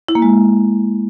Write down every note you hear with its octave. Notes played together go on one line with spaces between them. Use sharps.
E4
A#3
G#3